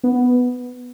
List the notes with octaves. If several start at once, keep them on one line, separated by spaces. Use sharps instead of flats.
B3